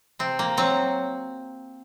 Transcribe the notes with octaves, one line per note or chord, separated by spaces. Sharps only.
C3 C4
A#3
F#3 C4